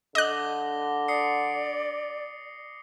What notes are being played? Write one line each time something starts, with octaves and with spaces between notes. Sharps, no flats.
D3 D#5 D6 F#6 A#6 G7
D5 D#6 C7 C#7